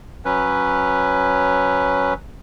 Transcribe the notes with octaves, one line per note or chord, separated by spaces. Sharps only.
F#3 C#4 B4